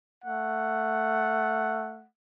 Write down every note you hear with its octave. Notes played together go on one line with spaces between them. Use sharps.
A3 F#5